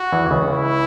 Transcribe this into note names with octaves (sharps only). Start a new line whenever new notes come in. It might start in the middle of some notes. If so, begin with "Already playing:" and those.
Already playing: F#4
E2 E3
C#2 C#3
E4